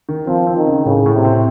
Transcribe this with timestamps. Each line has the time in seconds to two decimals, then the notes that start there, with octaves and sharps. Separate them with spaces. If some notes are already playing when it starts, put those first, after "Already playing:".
0.09 D#3
0.27 F3 C4
0.47 C4
0.57 D#3
0.66 C#3
0.85 A2 C#3
1.06 A2
1.15 C3
1.25 C4